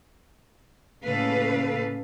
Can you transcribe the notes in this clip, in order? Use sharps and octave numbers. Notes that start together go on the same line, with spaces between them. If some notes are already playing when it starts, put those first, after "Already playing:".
A2 C#3 A#3 A4 B4 F5